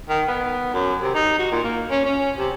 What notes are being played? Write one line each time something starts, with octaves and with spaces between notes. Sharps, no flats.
D#3
B3
F#2
C3
D#4
F#4
A#2
A#3
C#4
C#4
C3